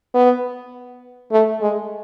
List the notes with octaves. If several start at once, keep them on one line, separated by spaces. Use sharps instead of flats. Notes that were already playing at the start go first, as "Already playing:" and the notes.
B3
A3
G#3